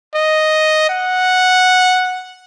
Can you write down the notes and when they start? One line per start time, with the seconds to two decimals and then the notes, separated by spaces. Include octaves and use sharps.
0.14 D#5
0.89 F#5